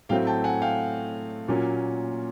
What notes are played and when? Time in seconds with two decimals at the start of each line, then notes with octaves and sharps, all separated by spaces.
0.09 A2 F#3 A3 C4 F5 G5
0.27 G5 A5
0.44 F#5 G#5
0.62 F5 G5
1.48 A#2 F#3 A#3 C#4